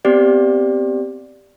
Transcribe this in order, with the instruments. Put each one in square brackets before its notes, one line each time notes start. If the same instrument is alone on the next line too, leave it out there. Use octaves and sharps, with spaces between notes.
[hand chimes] B3 C4 G4 D5